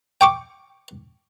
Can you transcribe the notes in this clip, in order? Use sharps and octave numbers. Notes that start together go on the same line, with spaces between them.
G5 C#6 D6